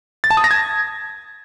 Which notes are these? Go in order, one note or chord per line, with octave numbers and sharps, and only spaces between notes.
A6
A5
D#6
A#6
G#6